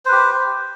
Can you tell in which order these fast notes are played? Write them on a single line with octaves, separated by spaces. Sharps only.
C5 B4 G4